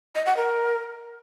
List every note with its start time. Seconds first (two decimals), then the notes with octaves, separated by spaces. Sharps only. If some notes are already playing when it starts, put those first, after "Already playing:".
0.15 D#5
0.26 F#5
0.37 A#4